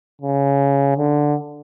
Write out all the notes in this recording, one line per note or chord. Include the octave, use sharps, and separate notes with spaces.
C#3
D3